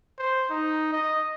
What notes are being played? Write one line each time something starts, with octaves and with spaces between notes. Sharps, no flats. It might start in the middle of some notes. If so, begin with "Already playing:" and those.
C5
D#4
D#5